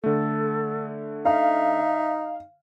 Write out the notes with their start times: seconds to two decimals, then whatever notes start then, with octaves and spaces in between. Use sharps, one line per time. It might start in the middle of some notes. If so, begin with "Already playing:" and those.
0.04 D3 A3 A4
1.25 D#4 E5 F5